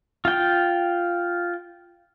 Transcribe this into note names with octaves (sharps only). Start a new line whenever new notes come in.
F4 G5